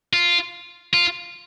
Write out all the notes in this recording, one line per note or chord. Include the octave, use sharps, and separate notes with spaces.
F4
F4